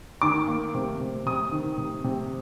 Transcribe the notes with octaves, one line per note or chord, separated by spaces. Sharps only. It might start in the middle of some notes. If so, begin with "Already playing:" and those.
D#3 D6
A#3
C3
C3
C3 D#6
D#3
C3
C3